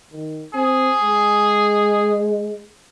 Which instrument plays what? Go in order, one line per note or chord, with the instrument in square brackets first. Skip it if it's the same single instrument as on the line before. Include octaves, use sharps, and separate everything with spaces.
[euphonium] D#3
[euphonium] C4 [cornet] G#4
[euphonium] G#3